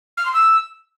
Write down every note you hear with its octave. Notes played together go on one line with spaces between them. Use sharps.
F6
C6
E6